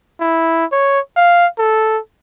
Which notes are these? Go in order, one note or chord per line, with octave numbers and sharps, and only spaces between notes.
E4
C#5
F5
A4